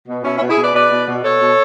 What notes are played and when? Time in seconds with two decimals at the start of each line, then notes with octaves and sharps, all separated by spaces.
0.08 B2
0.24 B2 C#4 E4
0.37 C#4 E4
0.42 B2
0.50 E4 G#4
0.58 B2 B4 D5
0.74 B2 B4 D5
0.91 B2
1.08 B2
1.24 B2 A4 C#5
1.41 B2